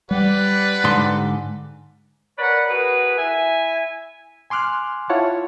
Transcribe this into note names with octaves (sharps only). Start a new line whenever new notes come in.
G3 G4 B4 D5 F#5
G#2 D3 C6
A#4 B4 C#5 D5 F#5
F#4 G#4 A#4 B4
E4 E5 G#5
G#5 C6 D6 F6 F#6
E4 F4 C#5 F#5 A5